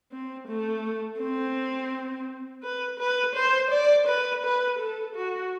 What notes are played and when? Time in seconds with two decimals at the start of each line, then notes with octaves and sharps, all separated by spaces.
0.12 C4
0.48 A3
1.19 C4
2.63 B4
2.99 B4
3.35 C5
3.71 D5
4.07 B4
4.43 B4
4.79 A4
5.15 F#4